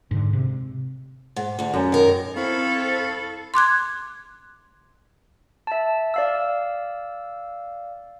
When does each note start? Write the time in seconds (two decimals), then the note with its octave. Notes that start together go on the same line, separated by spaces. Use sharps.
0.11 G#2 D3
0.33 C3
1.36 G#2
1.59 D2 D3
1.74 F#2
1.92 D#3 A#4
2.36 C4 E4 A4 F5 B5 C#6
3.54 C6 D6 F#6 G#6
5.67 E5 A5
6.14 D5 F5 E6